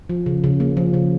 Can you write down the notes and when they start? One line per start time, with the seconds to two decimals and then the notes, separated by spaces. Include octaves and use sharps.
0.09 F3
0.26 C#3
0.44 C#3
0.60 A#3
0.77 F3
0.94 C#3